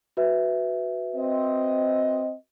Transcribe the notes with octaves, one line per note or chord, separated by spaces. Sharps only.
F#4 B4 E5
C4 D#5